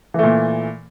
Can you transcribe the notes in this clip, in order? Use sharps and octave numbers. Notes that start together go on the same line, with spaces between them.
A#2 E3 A3